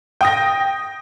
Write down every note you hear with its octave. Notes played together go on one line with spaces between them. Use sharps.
G5 D#6 A#6